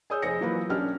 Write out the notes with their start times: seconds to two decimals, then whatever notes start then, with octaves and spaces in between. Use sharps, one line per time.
0.10 G#4 C#5 D#6 E6 G6
0.22 F1 G#4 C5 A#6 C#7
0.41 E3 F#3 A#3 F4 B4
0.69 B1 C#4 D4 G4 F6